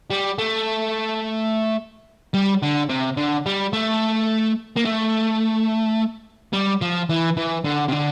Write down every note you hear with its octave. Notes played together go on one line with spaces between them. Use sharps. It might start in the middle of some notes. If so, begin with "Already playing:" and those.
G3
A3
G3
D3
C3
D3
G3
A3
A#3
A3
G3
F3
E3
E3
D3
C3
D3